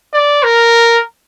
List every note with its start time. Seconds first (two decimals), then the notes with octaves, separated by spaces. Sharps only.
0.13 D5
0.43 A#4